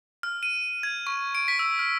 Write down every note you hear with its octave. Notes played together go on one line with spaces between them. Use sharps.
F6
D#7
G#6
C#6
D7
B6
E6
F6